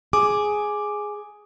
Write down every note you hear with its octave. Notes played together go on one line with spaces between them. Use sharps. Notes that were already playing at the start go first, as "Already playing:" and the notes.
G#4 D6